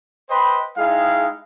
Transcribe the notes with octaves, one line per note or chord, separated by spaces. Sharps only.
B4 C5 D#5 G5 B5 C6
G#3 D#4 E4 G#4 F5 G5